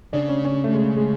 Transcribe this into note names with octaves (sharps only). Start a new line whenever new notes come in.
C#3 D4
C#4
C#4
A3
G#3
G#3